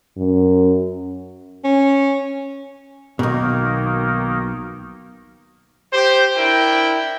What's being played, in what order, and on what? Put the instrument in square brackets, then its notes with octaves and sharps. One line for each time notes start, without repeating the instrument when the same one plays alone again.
[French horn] F#2
[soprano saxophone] C#4
[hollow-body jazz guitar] B1 B2 [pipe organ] D#3 A#3 D#4
[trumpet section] G4 C5
D4 E4 A#4 G5